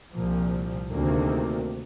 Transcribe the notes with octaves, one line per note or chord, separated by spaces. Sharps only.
C2 A#2 F3
D2 C3 D#3 A#3